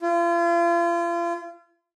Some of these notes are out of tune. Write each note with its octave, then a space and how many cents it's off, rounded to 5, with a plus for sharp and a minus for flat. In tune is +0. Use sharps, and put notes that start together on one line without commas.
F4 -40